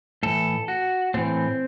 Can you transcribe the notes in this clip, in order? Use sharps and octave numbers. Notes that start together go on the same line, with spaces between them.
A2 E3 A4
F#4
A2 E3 C4